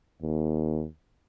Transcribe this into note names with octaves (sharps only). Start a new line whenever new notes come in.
D#2